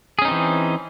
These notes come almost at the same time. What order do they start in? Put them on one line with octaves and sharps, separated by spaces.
G#4 C#4 D#4 C4 E3